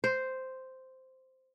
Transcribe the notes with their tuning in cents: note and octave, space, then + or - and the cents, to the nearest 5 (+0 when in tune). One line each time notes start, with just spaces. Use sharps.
C5 -5